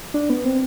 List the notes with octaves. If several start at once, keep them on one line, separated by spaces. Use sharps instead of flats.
D4
B3
C4